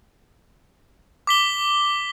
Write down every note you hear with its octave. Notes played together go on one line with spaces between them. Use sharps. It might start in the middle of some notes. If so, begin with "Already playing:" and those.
D6 B6 G7